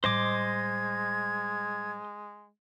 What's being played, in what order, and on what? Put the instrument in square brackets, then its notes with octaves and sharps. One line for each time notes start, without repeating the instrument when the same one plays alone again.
[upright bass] A2 G3 [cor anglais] G#3 [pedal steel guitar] C5 D#5 D6 [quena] G#6